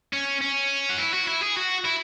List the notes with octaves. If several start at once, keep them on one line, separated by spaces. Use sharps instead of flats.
C#4
C#4
F#4
E4
F#4
E4
G#4
F#4
E4